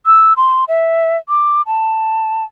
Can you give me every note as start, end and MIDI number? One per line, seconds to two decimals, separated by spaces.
0.06 0.33 88
0.37 0.64 84
0.68 1.17 76
1.29 1.62 86
1.67 2.44 81